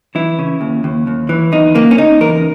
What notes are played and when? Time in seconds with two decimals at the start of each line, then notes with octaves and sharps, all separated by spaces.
0.15 E3 E4
0.39 C#3
0.61 D#2
0.84 D#2
1.07 D#2
1.29 E3
1.52 E2 D#4
1.75 C#3 A#3
1.91 C#4
1.98 C#3 D#4
2.21 E2 A#4